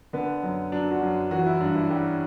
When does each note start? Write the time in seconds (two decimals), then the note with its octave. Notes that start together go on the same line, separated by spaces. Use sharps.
0.13 D3 B3
0.43 F#2
0.72 F#3 D4
0.91 F#4
1.01 F#2
1.31 E3 F#4
1.46 E4
1.60 G2 D4
1.75 E4
1.90 G3 G4